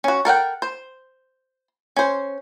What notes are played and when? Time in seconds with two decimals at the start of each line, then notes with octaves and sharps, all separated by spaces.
0.04 C#4 F#4
0.25 A4 A#4 F#5 G5
0.62 C5
1.96 C#4 C5